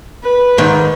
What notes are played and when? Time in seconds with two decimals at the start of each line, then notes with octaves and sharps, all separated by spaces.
0.23 B4
0.58 G#2 D#3